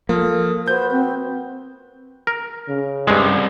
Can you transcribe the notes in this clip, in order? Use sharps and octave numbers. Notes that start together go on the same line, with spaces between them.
F3 A#3 A4 D#6 F6
F#4 B4 C5 G6
C4
A#4
C#3
C2 G2 G#3